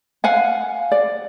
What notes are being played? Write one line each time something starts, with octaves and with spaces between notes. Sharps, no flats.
F5 F#5 G#5
D5